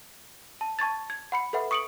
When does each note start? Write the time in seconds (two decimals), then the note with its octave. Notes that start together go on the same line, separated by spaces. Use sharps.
0.61 A5
0.79 A5 C#6 G#6 A6
1.10 G#6
1.32 F#5 B5 C#7
1.53 A4 B4 E5 F#5 B5
1.71 C#6 D#6 C#7 D7 F#7